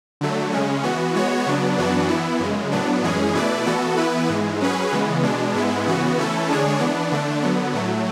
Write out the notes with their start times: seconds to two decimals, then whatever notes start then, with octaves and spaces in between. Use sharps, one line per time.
0.21 D3 F#3 A3
0.52 C#3 G#3 C#4
0.83 E3 B3 F#4
1.15 G#3 B3 F#4 C#5
1.46 C#3 F#3 B3 D4
1.78 F#2 E3 B3 D4 F#4
2.10 E3 B3 E4
2.40 F#2 C#3 G#3
2.72 A2 F#3 B3 D4
3.04 F#2 E3 G#3 C#4 G#4
3.35 B2 A3 E4 B4 D5
3.66 E3 B3 F#4 A4
3.97 E3 B3 E4 B4
4.29 G#2 E3 G#3
4.61 F#3 C#4 G#4 B4
4.92 C#3 E3 G#3 B3
5.23 B2 G#3 D4
5.55 G#2 G#3 B3 E4
5.86 C#3 E3 B3 F#4
6.16 E3 A3 C#4 E4 A4
6.49 D3 G#3 D4 G#4 C#5
6.79 E3 B3 D4
7.12 D3 A3 D4
7.43 D3 F#3 B3
7.73 A2 F#3 A3